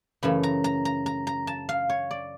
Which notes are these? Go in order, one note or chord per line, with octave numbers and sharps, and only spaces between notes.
F#2 C#3 E3 A3 B5
A#5
A#5
A#5
A#5
A#5
A5
F5
C#5
D5